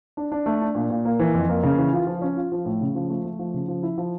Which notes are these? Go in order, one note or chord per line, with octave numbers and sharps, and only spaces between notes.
D4
D4
A3
D4
A#2
A#2
A#3
E3
F2
A#3
C#3
E3
F4
F3
C#4
F4
F3
A2
C#3
F3
A3
A3
F3
C#3
F3
E4
F3